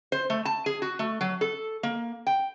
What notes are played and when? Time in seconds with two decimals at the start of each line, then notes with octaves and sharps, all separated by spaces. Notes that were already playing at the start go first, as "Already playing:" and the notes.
0.12 C5
0.30 A3
0.45 A5
0.66 G#4
0.82 F#4
0.99 A3
1.21 F#3
1.41 A4
1.83 A#3
2.27 G5